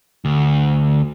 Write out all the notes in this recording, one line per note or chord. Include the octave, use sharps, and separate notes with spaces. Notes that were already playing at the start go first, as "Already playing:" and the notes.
D2